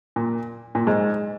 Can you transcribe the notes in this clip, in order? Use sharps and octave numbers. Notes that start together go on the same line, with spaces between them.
A#2
A#2
G#2